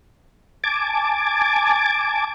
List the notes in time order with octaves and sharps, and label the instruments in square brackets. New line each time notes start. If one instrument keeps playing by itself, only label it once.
[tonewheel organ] G#5 A5 D6